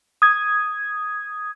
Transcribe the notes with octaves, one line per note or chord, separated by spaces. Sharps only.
D#6 G#6